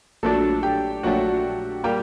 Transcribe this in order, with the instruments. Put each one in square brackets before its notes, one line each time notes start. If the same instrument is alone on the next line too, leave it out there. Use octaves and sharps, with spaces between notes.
[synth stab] A#1 A#2 F#3 A3 D4 [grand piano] A4 A5
[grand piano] G4 G5
[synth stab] A#1 A#2 F#3 A3 D4 [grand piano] F#4 F#5
[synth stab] A#2 G3 A#3 [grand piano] G4 G5